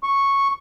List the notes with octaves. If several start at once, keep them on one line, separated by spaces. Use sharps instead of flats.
C#6